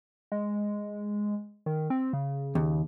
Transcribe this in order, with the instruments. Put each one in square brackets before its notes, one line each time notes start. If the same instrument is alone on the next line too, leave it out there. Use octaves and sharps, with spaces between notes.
[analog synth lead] G#3
D#3
C4
C#3
[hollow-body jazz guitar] D#2